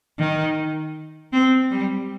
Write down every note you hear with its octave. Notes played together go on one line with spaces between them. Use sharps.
D#3
C4
G3